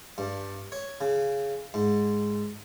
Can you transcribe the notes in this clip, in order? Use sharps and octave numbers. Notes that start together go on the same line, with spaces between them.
G2
C#5
C#3
G#2